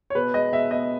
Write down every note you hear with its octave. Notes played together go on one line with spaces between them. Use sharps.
C#5
B2 B4
G#3 D#5
B2 E5
B3 D#5